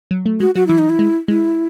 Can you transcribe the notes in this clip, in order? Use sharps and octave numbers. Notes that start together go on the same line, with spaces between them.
F#3
A3
G#3 F#4
F#3 F#4
E3 E4
D#4
E4
G#3
G#3 E4